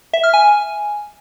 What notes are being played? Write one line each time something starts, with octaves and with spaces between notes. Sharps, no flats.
E5
F6
G#5